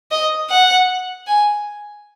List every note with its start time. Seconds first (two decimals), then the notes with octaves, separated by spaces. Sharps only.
0.11 D#5
0.50 F#5
1.27 G#5